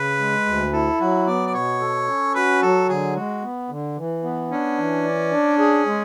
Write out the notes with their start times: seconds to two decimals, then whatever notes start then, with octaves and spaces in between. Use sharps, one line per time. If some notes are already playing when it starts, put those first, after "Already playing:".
Already playing: C#3 B4
0.19 G#3
0.46 D2
0.73 E4 A4
1.00 F#3 F#4
1.27 B3 D5
1.47 D5
1.54 B2 C#5
1.81 A4
2.08 C#4
2.35 F#4 B4
2.62 F#3 A4
2.89 D3 G#4
3.16 G#3 F#4
3.43 B3
3.70 D3
3.97 E3
4.24 B3
4.51 C#4 D4
4.78 E3
5.05 D5
5.32 D4
5.59 G#4
5.86 G#3